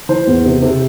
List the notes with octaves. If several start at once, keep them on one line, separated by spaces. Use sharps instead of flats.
E3 C5
E2
C3
C3